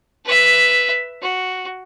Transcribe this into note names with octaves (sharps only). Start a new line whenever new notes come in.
B4 E5
F#4